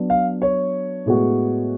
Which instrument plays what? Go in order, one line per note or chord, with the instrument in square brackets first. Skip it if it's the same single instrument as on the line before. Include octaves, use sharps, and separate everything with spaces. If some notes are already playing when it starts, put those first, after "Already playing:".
Already playing: [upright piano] F#3 B3 D4
[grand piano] F5
C#5
[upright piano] A2 G#3 B3 F#4